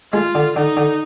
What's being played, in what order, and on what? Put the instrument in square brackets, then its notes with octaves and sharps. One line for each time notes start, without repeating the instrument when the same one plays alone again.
[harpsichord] G#3 [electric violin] F4
[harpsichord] D3
[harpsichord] D3 [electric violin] D#4
[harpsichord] D3